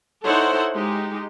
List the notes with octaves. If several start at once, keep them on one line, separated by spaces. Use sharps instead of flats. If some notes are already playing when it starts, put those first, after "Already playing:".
D#4 E4 A4 C5 C#5 F#5
G#3 D#4 G4